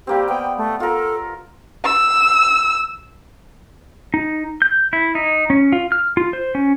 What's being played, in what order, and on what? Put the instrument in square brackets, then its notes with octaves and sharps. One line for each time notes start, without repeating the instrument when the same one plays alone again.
[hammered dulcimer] G3 A#3 C4 [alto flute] G4
[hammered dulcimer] B3 [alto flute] G5
[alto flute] A3
[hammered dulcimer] F4 A#4 [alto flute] A4
[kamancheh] E6
[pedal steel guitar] D#4
G6
E4
D#4
C#4
F4
F6
F4
C5
C#4